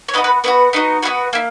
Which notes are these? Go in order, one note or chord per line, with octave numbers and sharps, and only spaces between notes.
C#5
B3 D#4 F#4 B4 D#5
B4
B3 D#4 F#4 B4
B3 D#4 F#4
B3 D#4 F#4 B4
A#3 E4